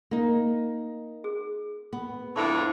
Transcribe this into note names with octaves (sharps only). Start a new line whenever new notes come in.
A#3 D#4
G#4
B3
F2 A2 D3 E4 A4 E5 C#6